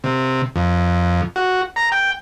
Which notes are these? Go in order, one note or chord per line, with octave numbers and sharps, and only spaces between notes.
C3
F2
F#4
A#5
G5